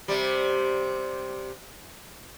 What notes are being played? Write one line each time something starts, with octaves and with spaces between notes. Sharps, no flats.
C3 G3